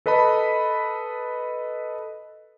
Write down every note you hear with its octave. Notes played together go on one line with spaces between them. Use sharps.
A4 B4 D#5 A5 B5